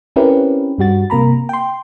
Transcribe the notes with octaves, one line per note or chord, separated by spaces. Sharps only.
C4 C#4 E4 G4 A#4 B4
G2 G3 F#4 A6
C3 A#3 A#5 B5
G5 C6